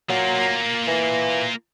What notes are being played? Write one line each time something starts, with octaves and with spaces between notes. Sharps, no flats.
F#3 A#3 F4
E3